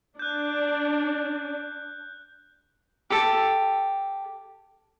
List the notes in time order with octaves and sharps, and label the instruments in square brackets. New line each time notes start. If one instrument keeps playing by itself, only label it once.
[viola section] D4 [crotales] F#6 G6
[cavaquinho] G4 A4